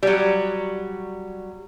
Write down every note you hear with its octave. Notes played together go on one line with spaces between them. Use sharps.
F#3 G3